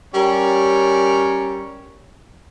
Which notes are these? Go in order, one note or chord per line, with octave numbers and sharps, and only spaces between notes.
G3 C#4 A#4 C#5